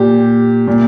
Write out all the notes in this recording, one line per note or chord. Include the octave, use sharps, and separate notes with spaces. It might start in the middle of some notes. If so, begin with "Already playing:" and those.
Already playing: A#2 G4
A#2